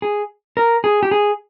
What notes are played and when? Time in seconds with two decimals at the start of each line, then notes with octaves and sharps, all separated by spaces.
0.02 G#4
0.57 A#4
0.84 G#4
1.03 G4
1.11 G#4